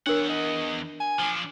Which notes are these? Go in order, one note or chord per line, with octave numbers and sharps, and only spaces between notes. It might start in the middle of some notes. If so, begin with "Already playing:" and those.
E2 D4 A#4 C#5 F#5
D#5
G#5
F3 D4